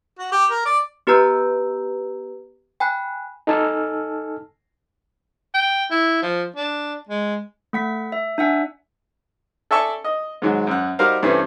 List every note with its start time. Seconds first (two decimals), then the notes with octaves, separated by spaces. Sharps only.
0.19 F#4
0.32 G4
0.51 A#4
0.65 D5
1.07 B3 G4 B4 A#5 E6 G6
2.80 G5 G#5 B5 F#6
3.47 D#4 A4 G#5 A5 E6 F6
5.54 G5
5.91 E4
6.22 F3
6.56 D4
7.09 G#3
7.73 A3 F#5 B6
8.12 E5
8.38 D4 E5 F#5 G#5
9.71 A4 D5 E5 G#5 A5 C#6
10.04 D#5
10.42 G#2 D#3 F#3 G#3
10.67 F#2 F#5
10.99 G3 D#4 F#4 A#4 C5 F5
11.23 G2 E3 G3 A3 C4 C#4